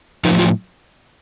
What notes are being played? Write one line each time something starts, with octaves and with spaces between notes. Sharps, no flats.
A2 F3 D#4
F4